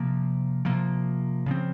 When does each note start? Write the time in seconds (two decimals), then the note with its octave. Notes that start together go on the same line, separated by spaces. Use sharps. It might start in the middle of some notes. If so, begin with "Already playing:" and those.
Already playing: C3 F3 A#3
0.65 C3 F3 A#3
1.46 C#3 F3 C4